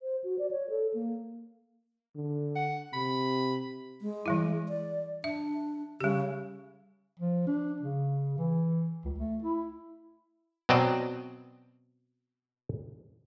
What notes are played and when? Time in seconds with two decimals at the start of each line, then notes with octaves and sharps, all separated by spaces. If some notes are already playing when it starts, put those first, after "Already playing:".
0.02 C5
0.24 F#4
0.39 D5
0.51 C#5
0.70 A4
0.94 A#3
2.16 D3
2.56 F#5
2.93 C3 B5
4.00 G#3
4.26 E3 G3 E4
4.69 D5
5.24 D4 E5
6.01 C#3 G3 G4
7.20 F3
7.47 D4
7.81 C#3
8.38 E3
9.05 C#2
9.18 A3
9.43 E4
10.69 B2 F#3 C4 D5 D#5 A5